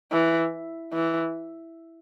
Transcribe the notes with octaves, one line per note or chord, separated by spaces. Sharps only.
E3
E3